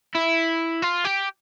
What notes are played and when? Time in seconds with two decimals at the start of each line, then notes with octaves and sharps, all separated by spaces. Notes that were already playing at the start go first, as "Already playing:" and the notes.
0.15 E4
0.83 F4
1.05 G4